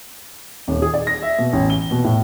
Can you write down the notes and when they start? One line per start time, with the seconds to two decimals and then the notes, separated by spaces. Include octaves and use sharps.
0.68 D#1
0.82 G#4
0.94 D5
1.07 A#6
1.22 E5
1.38 B2
1.53 A1
1.70 G7
1.91 B2
2.04 A2